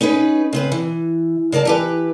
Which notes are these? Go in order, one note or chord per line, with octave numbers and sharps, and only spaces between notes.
C#4 D#4 G#4 B4
C#3 C4 B4
E3
C#3 A#4 D5 A5
E3 G4 B4